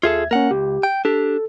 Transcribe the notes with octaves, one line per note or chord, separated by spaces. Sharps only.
D#2 F4 G#4 A4 E5 G#6
A#3 C#4 A#4 F#5
C#2 G4
G5
D4 G4 A4